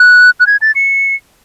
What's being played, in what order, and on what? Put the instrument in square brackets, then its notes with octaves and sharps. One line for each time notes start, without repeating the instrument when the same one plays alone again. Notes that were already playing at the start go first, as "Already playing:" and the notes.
Already playing: [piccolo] F#6
F#6
G#6
A6
C#7